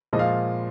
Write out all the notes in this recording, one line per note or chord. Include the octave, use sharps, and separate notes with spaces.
A#2 F3 G#3 D#5
F5